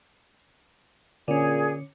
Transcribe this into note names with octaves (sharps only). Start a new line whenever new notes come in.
A#2 D3 C#4 G#4